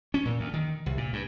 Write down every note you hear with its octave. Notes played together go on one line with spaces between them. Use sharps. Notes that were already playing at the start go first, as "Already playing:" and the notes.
C#4
A#2
D2
D#3
C2
A#2
G2